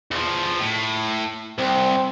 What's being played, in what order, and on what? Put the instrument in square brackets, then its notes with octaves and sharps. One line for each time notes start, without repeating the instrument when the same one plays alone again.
[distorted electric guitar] E2 F3
A2
[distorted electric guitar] C2 [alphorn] C4